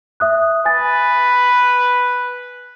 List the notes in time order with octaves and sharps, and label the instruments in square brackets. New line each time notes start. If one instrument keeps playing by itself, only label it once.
[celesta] E5 D#6 F#6
[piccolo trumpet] B4 [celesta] G#5 A6